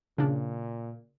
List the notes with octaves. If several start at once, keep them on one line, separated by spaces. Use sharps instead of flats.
A#2 C#3 D4